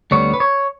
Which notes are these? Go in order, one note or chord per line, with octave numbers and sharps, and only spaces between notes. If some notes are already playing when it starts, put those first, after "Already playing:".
D2 D3 G3 B3 C#5
B4
C#5